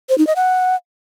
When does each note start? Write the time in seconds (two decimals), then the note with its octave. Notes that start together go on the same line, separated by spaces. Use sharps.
0.09 C5
0.18 D#4
0.27 D#5
0.36 F#5